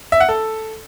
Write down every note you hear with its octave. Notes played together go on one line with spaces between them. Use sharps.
E5
F#5
A4